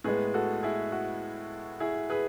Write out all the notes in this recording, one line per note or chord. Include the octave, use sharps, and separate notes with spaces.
A2 G#3 B3 G#4 B4
F#4 A4
E4 G#4
F#4
E4 G#4
G#4 B4